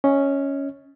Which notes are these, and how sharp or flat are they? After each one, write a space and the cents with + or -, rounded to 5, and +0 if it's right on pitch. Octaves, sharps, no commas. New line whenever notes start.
C#4 +0 D#5 +30